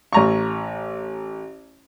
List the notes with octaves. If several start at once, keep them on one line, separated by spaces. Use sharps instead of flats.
A1 A#5 C#6